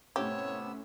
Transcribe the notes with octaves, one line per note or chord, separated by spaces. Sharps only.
A2 C3 B3 C#4 G4 C#5 E6